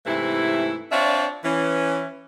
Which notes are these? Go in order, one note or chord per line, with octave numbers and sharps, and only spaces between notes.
G#2 C3 E3 A3 E4
C4 D4 F4 C#5 D5 E5
E3 C#4